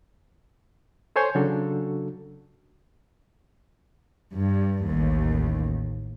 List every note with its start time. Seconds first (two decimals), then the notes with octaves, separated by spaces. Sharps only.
1.16 A4 C5 C#5 G#5 C6 G6
1.35 C#3 F#3 D4 F#4 A4
4.35 G2
4.88 A1 D#2